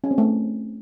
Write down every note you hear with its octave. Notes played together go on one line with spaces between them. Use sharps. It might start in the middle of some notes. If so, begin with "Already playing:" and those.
C#4
C4
A3